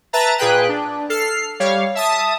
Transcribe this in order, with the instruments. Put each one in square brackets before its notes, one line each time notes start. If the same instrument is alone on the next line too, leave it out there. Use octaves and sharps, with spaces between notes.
[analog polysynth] B4 E5 A5 A#5 A6
A#2 G#4 B4 G5 F#6
D4
A4 F6 C7
G3 C#5 F5
E5 A5 D#6